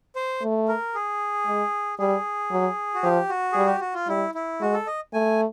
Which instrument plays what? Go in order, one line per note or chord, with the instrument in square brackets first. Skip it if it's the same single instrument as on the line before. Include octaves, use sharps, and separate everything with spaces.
[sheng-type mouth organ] C5
[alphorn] A3
[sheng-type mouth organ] A#4
G#4
[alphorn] G#3
[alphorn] G3 [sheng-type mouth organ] G#4
[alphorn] F#3
[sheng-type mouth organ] F#4
[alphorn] F3 [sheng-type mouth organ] G4
[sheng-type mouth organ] F#4
[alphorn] G3 [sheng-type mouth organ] G#4
[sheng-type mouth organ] G4
F#4
F4
[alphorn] G3 [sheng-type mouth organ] E4
[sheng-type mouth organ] E4
[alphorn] G#3 [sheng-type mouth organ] F#4
[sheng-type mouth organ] A4
D#5
[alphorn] A3 [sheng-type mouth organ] G#5